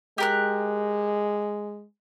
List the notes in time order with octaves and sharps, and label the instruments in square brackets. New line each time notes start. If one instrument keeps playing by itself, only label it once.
[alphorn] G#3 [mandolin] G4 A#4 F#6